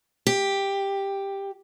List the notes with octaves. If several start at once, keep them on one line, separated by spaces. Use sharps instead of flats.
G4